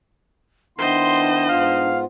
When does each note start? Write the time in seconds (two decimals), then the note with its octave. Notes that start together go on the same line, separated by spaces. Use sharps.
0.79 D#3 B3 D4 E4 C5 D#5 C6
1.49 G#2 B3 F4 F5